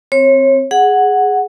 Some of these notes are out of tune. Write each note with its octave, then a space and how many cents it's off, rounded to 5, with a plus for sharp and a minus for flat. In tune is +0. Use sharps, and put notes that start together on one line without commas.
C4 +0 C#5 -30
G#4 +0 F#5 +0